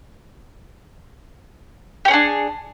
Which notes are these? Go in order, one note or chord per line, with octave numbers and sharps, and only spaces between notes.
C#4 D4 G4 G#4